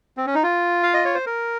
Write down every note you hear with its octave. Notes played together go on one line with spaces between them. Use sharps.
C4
C#4
D#4
F4
F5
D#5
C#5
C5
A#4